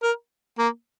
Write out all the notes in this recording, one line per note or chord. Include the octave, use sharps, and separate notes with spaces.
A#4
A#3